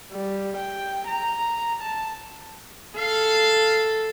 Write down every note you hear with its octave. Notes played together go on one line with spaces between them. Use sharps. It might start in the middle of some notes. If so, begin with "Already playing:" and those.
G3
G5
A#5
A5
A4 F5